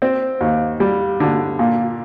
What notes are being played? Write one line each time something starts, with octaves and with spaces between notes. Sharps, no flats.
C4
D#2
G3
D3
A#2